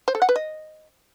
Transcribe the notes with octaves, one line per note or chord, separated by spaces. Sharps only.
C5
A4
F#5
B4
D#5